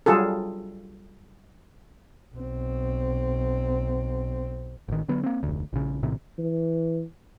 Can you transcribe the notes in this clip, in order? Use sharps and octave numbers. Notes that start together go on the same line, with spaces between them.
F#3 G3 F4 G#4 A4
B1 C4
A1 D#3
D3 F#3 B3
A#3 C4
F1 D2
A#1 C#3
A#1 A2 C3 D#3
E3